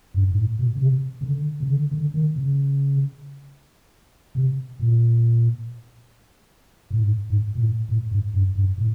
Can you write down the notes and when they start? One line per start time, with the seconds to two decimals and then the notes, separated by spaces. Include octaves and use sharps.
0.14 G2
0.32 G#2
0.37 A2
0.59 B2
0.75 C#3
0.81 C3
1.21 C#3
1.26 D3
1.60 C#3
1.70 D3
1.91 D3
2.14 D#3
2.36 C#3
4.35 C3
4.80 A#2
6.91 A2
7.01 G#2
7.30 G#2
7.55 A#2
7.60 A2
7.89 A2
8.11 G#2
8.34 G2
8.55 G2
8.78 A2